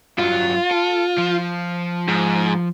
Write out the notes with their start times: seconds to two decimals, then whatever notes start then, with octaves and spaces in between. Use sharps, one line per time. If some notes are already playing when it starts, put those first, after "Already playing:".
0.19 G2 F#3 F4
0.71 A4
1.18 F3
2.08 G#2